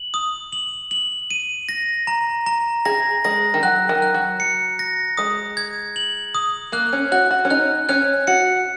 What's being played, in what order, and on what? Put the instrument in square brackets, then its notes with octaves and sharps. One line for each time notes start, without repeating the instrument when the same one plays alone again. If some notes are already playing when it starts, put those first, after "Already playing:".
Already playing: [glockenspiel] F#7
D#6
F#7
F#7
D#7
A#6
A#5
A#5
[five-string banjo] G#4 [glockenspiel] A#6
[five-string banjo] G#3 [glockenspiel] A#6
[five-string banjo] D#3
[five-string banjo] F#3 [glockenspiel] F#6
[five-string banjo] D#3
[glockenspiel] F#6
[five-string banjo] F#3
[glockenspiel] C#7
A#6
[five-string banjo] G#3 [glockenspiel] D#6
[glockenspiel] G#6
F#7
D#6
[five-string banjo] A#3 [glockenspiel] F#6
[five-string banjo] C#4
[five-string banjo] F#4 [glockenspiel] F#6
[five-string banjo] F#4
C#4
[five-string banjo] D#4 [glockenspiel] F#6
[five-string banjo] C#4 [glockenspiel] F#6
[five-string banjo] F#4 [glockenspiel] C#7